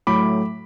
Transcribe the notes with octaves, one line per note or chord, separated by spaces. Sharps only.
A2 F#3 A3 B5 D6